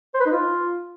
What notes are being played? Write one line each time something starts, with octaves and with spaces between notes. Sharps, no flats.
C5
B4
D#4
F4